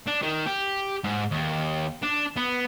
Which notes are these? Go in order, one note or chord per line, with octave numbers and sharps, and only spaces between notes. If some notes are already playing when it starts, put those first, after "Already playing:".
D4
D#3
G4
G#2
D#2
D4
B3